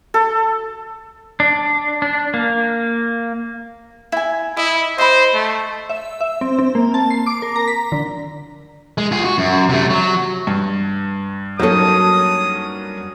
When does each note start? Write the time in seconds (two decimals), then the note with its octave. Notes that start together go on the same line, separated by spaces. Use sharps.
0.14 A4
1.40 D4
2.02 D4
2.34 A#3
4.12 E4 G#5
4.57 E4 D#5
4.98 C5 D#5 B5
5.34 A3
5.89 E5
6.21 E5
6.41 C4
6.59 C4
6.75 A#3
6.94 A5
7.10 C7
7.26 D6
7.42 A#4
7.56 A#5
7.68 B6
7.92 D3
8.98 G#3
9.12 F4 G#4
9.25 F#4
9.38 F#2
9.69 C3 A3
9.90 F#3
10.47 G2
11.60 F#3 A#3 C#4 D#4 A4 D#6